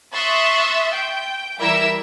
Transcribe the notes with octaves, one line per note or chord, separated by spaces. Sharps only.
E5 C6 C#6 D#6 F#6 A6
G5
E3 G3 E4 A#4 E5 E6